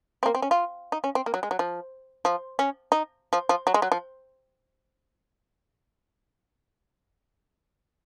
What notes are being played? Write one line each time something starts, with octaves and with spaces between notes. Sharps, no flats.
C4
A#3
C4
C#4
F4
D#4
C#4
C4
A#3
F#3
G#3
F#3
F3
F3
C#4
D#4
F3
F3
F#3
G#3
F#3
F3